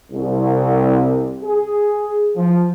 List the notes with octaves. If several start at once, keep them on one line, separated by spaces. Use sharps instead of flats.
C2
G#4
F3